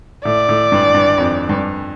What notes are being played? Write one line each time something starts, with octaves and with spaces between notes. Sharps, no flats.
A2 D5
A2
G2
G2
F2
G2